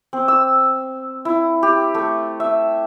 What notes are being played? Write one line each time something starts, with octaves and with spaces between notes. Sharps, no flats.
C4
E6
E4
G4
A3
E5